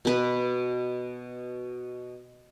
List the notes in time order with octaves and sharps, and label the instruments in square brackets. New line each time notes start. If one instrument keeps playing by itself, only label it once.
[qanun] B2 B4